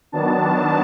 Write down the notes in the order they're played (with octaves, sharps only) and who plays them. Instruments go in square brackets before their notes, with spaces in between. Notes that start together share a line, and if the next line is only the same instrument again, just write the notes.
[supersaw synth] D#3 F#3 B3 D4 A5